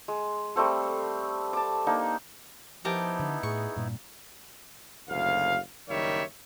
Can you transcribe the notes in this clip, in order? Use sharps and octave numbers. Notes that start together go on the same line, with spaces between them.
G#3
G3 A3 C4 A4
A5 D6
A#3 D4 D#4
F3 B3 D#4 E4 G4 A#4 A5
D3
A2 G#4 C#6
G2 A#2
F#1 D2 F5
F#1 D#3 G3 C#5 E5